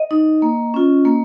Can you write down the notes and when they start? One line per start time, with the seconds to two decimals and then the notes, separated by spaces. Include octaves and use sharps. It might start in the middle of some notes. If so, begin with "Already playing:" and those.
Already playing: D#5
0.11 D#4
0.42 A#3
0.74 C#4 F4
1.05 A#3